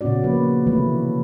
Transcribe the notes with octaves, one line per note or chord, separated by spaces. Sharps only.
A#2 C#3 B3 C#4 F#4 D5
F3 A#3 B4
C3 D#3 E3 A3 B4